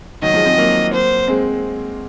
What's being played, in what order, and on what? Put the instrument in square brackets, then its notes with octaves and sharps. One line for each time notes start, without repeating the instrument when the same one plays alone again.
[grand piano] D#3 F#3 [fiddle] D#5
[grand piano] F3 G#3
G#3 C4
F#3 A#3
[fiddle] C5
[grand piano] G#3 C4